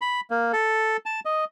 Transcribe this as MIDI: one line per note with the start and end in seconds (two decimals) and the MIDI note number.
0.01 0.21 83
0.31 0.52 58
0.53 0.97 69
1.06 1.20 81
1.25 1.45 75